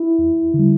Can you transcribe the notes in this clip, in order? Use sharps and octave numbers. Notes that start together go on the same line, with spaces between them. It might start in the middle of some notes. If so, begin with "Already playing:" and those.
Already playing: E4
E2
D3
G3